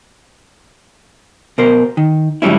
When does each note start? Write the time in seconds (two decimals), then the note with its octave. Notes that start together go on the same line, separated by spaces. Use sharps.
1.58 B2 A#4 C5
1.97 D#3
2.42 G#2 D3 F#3 G3 C#4 E4